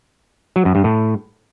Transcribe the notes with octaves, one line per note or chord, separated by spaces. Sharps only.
F#3
F#2
G2
A2